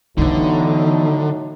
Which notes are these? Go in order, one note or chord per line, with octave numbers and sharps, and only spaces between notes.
A2 D3 E3 F#3 B3 D#4